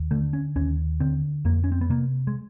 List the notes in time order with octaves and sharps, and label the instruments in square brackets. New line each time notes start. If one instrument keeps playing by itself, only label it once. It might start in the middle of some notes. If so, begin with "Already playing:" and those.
Already playing: [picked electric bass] D#2
D3 A3
C#4
D#2 C#4
D3 C4
F2 A#3
C#4
C4
B3
C3 A#3
G#3